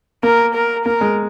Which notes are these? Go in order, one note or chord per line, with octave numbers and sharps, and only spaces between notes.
A#3 A#4
A#4
A#3 A#4
G#3